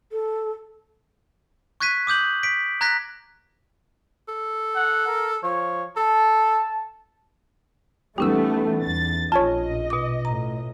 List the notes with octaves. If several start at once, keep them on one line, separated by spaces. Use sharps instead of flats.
A4
C#6 F#6 G#6 B6 D#7
D6 D#6 G6 F#7
B6 D7
A#5 F#6 G#6 A#6 B6
A4
F#5
A#4
F3 C#5
A4 A5
E3 G3 A3 B3 C#4 D#4 G4 E6
E2 A6
A#1 F4 C#5 D#5 G#5 A5
B2 D6
A2 A#5